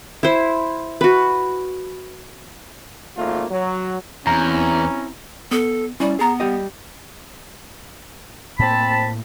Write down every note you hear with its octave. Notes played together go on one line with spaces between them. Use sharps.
E4 C5
F#4 B4
G#1 A3 A#3 F4
F#3
E2 C4 C#4 E4 A#5
B3 A4
G3 C#4 E4 D5
B3 G#4 A#5
G3 G4 D#5
A2 A#3 C4 A5 B5